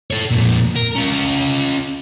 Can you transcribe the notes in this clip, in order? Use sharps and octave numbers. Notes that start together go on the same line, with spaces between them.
A4 C#5
F2 A#2
A#4
C#4 F4